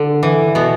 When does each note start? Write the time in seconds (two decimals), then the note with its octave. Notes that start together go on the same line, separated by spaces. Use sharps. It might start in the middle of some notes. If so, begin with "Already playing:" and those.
Already playing: D3
0.23 E3
0.55 B2 B3